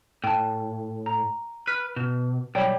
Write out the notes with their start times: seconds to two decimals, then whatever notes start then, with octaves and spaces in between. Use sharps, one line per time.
0.24 A2 G5 A5
1.06 A#5
1.67 B4 F6
1.96 B2
2.55 B1 G3 C#5 D5 G5